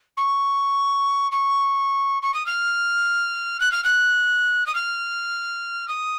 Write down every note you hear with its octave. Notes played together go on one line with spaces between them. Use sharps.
C#6
C#6
C#6
D#6
F6
F#6
F6
F#6
D#6
F6
D#6